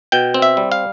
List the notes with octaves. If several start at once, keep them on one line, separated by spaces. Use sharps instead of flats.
B2 G5
C4
E5
G3
F5